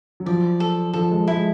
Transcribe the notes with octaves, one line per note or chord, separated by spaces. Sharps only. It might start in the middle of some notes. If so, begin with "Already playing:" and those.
F#3
F3 D5
A4
F3 A4
G#3
G#3 E4